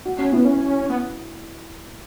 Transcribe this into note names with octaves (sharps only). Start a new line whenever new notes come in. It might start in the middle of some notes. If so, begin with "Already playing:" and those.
F#4
C#4 F#4
B3 E4
C#4
B3